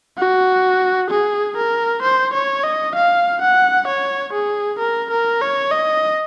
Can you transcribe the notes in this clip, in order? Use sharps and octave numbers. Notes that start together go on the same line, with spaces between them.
F#4
G#4
A#4
C5
C#5
D#5
F5
F#5
C#5
G#4
A#4
A#4
C#5
D#5